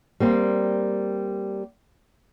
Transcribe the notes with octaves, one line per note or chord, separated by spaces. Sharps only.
G3 A#3 C4